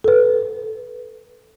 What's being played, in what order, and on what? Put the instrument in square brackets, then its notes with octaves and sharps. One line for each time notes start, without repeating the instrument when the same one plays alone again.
[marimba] A4 B4